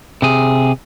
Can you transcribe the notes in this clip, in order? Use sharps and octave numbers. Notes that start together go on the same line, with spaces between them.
C3 G#4